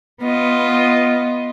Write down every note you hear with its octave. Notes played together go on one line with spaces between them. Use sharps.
B3 F4 D#5